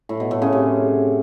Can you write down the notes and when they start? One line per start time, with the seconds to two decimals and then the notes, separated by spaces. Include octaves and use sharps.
0.09 A2
0.20 B2
0.31 A2
0.42 C#3
0.52 C3